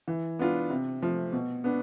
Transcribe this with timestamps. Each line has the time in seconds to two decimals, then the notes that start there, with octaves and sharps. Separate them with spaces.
0.08 E3
0.39 B3 D4 F4
0.70 C3
1.02 F3 A3
1.33 B2
1.64 B3 D4